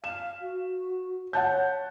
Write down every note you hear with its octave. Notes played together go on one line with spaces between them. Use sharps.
F5 E7
F#4
C#5 F#5 A5 G6